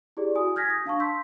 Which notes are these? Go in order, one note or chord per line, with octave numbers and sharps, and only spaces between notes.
E4 G4 G#4 D5
E4 F#4 G#5 D#6
G#5 F6 G6 G#6 A#6 B6
D#6 A#6
D4 F5 A5 C#6
C6 E6 G6 B6